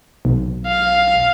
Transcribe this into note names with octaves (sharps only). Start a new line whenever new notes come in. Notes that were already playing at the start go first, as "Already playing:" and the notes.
B1
F5